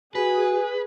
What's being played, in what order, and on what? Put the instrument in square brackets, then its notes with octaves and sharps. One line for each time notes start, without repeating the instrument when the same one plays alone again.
[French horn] F#4 [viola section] G#4 [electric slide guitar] B4 [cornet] G#5